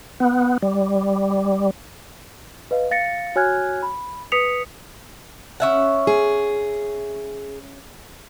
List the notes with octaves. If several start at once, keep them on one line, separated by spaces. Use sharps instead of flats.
B3
G3
B4 D#5 F5
F5 A6 A#6 C#7
F#4 C#5 G#5 F6 F#6 G#6
B5
B4 D#6 B6 C#7 F7
C#4 E5 F#5
G#4